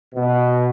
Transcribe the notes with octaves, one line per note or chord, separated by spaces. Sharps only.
B2